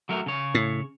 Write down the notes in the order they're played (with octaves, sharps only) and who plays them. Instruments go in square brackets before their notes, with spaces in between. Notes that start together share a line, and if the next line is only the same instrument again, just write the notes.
[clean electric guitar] F#3 A3 A#4
C#3 C#5
[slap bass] A2